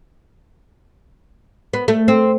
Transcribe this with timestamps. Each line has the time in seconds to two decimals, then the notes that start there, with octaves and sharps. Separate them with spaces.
1.73 B3
1.88 A3
2.08 C4